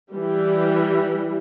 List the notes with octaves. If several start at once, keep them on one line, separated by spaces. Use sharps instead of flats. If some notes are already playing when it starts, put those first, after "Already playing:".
E3 G3